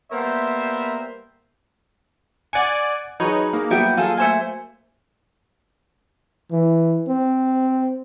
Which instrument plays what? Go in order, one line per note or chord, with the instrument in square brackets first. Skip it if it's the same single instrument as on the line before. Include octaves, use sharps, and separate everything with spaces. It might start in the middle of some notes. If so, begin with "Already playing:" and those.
[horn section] G3 A#3 B3 A#4 C5 E5
[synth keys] D5 G#5 [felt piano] F#5 F#6 C#7
[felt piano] F#3 G#4 [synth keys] D#4 C#5 [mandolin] B4
[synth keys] A#3 [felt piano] D#4 G#4
[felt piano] F#3 G3 [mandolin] B3 E4 G5
[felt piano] F#3 [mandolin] F4 G#4 A4
[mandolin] A3 C5 G#5
[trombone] E3
C4